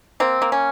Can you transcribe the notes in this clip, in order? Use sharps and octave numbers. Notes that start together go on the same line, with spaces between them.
A#3 C4
A#3
C#4